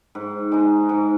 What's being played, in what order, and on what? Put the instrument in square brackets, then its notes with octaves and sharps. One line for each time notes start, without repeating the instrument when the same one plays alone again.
[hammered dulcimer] G#2
G#3 D#4
G#2